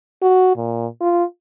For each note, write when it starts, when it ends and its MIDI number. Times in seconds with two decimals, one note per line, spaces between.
0.22 0.54 66
0.57 0.87 46
1.01 1.24 65